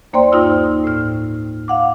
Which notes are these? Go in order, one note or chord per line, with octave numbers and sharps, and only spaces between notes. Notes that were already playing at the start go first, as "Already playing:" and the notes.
D#2 A#3 C5 D5 G5 C6
G2 D#4 F4 E6
A2 F6
F5 F#5 D6